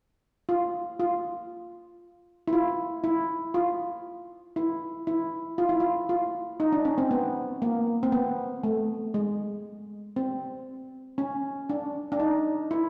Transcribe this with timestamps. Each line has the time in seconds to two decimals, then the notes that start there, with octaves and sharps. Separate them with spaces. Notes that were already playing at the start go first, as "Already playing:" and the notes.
0.49 F4
1.00 F4
2.48 E4
2.53 F4
3.04 E4
3.54 F4
4.56 E4
5.07 E4
5.58 F4
5.69 E4
5.80 F4
6.09 F4
6.60 D#4
6.72 D4
6.85 C#4
6.98 C4
7.11 B3
7.62 A#3
8.03 C4
8.12 B3
8.64 A3
9.14 G#3
10.16 C4
11.18 C#4
11.70 D4
12.12 D4
12.20 D#4
12.71 E4